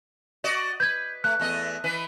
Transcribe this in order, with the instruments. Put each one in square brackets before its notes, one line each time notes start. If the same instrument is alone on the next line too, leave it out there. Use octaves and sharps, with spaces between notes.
[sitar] F#4 D5 D#5
[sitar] B4 [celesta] G6 G#6
[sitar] A3 [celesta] F#6
[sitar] E2 A3 D#5
E3 B4